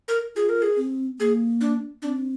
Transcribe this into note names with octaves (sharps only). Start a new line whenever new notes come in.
A#4
F4 G#4
A#4
G#4
C4
A#3 G#4
D4
C4 D4